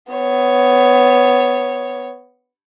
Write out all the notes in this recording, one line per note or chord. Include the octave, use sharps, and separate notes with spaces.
B3 C#5